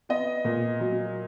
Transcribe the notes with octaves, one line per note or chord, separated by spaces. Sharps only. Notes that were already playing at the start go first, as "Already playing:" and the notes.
B3 D#5
A#2
F#3